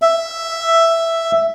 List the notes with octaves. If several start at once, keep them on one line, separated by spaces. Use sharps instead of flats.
E5